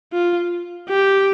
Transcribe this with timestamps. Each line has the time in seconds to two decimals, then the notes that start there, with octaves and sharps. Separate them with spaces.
0.13 F4
0.89 G4